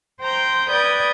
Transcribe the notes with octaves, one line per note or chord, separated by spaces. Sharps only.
C5 G5 A#5 G6
B4 D5 G5 D#6 G6 G#6